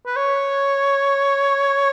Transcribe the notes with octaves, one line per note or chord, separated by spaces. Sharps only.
B4
C#5